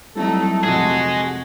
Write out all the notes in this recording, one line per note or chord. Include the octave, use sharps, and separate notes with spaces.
F#3 G3 A3 C4 D#4 E4 A4
F1 C3 F3 F#4 G#4 D#5